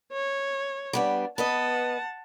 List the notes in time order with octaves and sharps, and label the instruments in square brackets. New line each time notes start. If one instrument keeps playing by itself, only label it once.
[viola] C#5
[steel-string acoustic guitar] G3 B3 D4
[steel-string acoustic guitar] B3 B4 D#5 [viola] F#5 A5